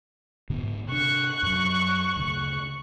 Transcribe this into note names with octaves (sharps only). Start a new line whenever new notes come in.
G#2 D3 B3
C3 D4 C#6 F#6
F#2 F#3
D2 C#3